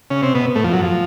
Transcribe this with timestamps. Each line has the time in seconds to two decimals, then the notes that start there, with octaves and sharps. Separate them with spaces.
0.10 C#3 C#4
0.22 C3 C4
0.35 B2 B3
0.55 A2 A3
0.64 F2 F3
0.73 F#2 F#3
0.82 F3